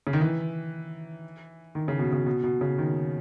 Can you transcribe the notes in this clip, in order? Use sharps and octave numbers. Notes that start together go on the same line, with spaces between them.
C#3
D#3
E3
D#3
C#3
B2
C#3
B2
B2
C#3
D#3